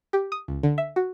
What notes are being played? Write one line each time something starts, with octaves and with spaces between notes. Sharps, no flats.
G4
D#6
C#2
D3
E5
F#4